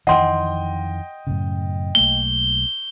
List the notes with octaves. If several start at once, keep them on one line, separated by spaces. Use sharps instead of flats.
F2 D#3 E3 D#5 F#5 G5 C6
F#2 A2 C#3
B1 A3 A#3 G7